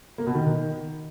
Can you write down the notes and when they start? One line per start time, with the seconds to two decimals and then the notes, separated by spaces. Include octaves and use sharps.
0.18 A#3
0.27 B2
0.35 D#3